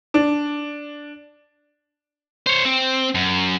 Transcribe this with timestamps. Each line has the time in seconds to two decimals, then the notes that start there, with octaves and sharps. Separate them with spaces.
0.14 D4
2.47 C5 C#5
2.65 C4
3.15 F#2